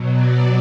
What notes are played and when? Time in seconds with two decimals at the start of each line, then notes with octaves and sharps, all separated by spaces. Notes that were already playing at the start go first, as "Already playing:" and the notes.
Already playing: B2 F#3
0.12 D5